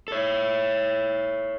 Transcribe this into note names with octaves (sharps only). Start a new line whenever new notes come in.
A4 C#5